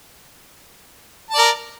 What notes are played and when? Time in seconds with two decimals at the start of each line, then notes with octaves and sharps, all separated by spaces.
1.30 A5
1.34 D5
1.38 A#4